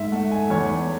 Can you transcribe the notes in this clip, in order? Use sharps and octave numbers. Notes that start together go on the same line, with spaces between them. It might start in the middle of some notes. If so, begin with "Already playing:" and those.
Already playing: G#2 E5
A3 F#5
G#5
E2 C#5